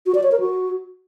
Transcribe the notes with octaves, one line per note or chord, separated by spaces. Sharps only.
F#4
D5
C#5
A#4
F#4